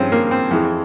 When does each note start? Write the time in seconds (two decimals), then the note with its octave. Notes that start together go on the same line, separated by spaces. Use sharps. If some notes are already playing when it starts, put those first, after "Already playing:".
Already playing: G2 F3 G#3 C4 C#4
0.12 A#3
0.31 C4
0.51 F2 E3 G#3